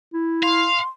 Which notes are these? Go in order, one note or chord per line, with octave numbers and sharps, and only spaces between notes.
E4
F5 C6